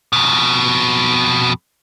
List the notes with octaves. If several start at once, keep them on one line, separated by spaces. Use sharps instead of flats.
F2 B2